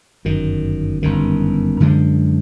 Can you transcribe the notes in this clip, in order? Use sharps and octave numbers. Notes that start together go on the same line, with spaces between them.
G1 F#2 D#3
G1 F#2 D#3
F#2 D3 F3 G#3